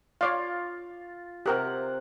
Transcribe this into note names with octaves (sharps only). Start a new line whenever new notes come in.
F4 C#5 D5 F5
C3 G4 A#4 F#5 G5